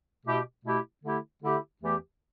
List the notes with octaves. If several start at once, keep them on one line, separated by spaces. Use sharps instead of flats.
B2 A3 E4 G4
B2 A3 E4 G4
D3 A3 E4 G4
D3 A3 E4 G4
E2 E3 A3 G4